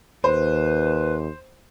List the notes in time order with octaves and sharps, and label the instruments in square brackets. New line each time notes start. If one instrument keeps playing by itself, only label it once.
[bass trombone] D#2 [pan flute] B4 [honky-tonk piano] C5